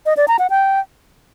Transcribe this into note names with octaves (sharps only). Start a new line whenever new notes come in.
D#5
D5
A#5
F#5
G5